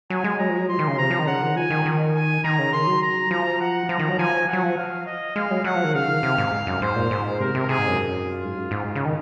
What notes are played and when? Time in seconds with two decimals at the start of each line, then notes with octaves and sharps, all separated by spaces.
0.10 F#3 G#5
0.24 G#3
0.39 F#3 A#5
0.49 F3
0.58 F#3
0.68 F3 C6
0.79 D#3
0.88 C#3
0.98 C3 A#5
1.10 F3
1.19 D#3
1.27 C#3 F#5
1.41 D#3
1.56 F3 G#5
1.71 D#3
1.86 D#3
2.15 G#5
2.44 D#3 A#5
2.59 C#3
2.73 D#3 C6
2.87 F#3
3.02 A#5
3.31 F3 A#5
3.61 F#5
3.89 F3 A#5
3.99 D#3
4.09 F#3
4.19 F3 G#5
4.48 F#3 F#5
4.63 F3
4.77 F5
5.06 D#5
5.36 G#3 F5
5.51 F#3
5.64 F#3 F#5
5.75 F3
5.84 D#3
5.94 C#3 F5
6.08 D#3
6.23 C3
6.38 G#2
6.67 F#2
6.82 G#2 C5
6.96 A#2
7.11 G#2
7.40 C3 A#4
7.55 C3
7.69 C3 G#4
7.79 G#2
7.88 F#2
8.27 F4
8.45 G#2
8.57 F#2
8.71 G#2
8.95 C#3
9.05 D#3